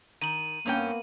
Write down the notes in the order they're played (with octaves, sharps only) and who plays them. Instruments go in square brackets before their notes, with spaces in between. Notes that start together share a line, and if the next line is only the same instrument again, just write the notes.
[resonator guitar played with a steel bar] D#3 [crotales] D#7 F#7
[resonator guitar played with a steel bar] G2 C#4 G5 [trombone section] A#3 B3